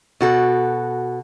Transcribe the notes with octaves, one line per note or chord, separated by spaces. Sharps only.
B2 F#4 A4